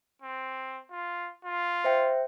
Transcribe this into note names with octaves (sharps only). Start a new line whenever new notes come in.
C4
F4
F4
C5 E5 G5